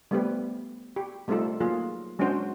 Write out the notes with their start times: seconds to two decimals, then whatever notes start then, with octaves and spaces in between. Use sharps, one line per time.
0.11 G3 A3 B3 C4 G4 B4
0.96 G4
1.28 G3 A3 C4 D#4 F4 A4
1.61 F#3 A#3 F4 G#4
2.19 F#3 G#3 C#4 D4 F#4 C5